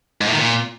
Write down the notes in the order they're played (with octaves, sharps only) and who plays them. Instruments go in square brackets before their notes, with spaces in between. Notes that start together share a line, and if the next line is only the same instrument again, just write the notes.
[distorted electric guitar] G#2
A2
D#3
A#2